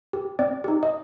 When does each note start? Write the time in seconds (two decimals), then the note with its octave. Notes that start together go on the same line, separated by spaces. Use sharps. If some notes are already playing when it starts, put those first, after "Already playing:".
0.13 G4
0.39 C4 D5
0.64 D#4 G4
0.83 D#5